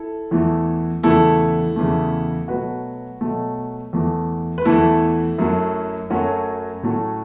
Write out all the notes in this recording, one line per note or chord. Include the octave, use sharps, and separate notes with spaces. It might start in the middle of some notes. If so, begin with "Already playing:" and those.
Already playing: E4 A4
E2 E3 A3
E2 C#3 E3 A3 E4 A4
E2 C#3 E3 A3
B2 F#3 A3 F#4 B4
B2 F#3 A3
E2 E3 A3
B4
E2 E3 A3 E4 A4
F#2 F#3 A3
F#2 F#3 A3 C#4 F#4
A2 F#3 A3